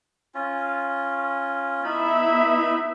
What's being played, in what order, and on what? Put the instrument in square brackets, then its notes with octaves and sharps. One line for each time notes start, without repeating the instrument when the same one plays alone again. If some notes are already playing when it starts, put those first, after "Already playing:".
[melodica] C#4 F4
[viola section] B3 E4 E5 [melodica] D#4 B5